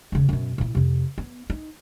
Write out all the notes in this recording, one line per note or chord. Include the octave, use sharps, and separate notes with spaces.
E1 C#3
F#2 B2
A#2 E4
F2 C3
B3
D#4